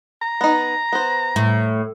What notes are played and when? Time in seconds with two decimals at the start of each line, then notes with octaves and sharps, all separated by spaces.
0.22 A#5
0.41 B3 D#4
0.93 B3 C5
1.36 A2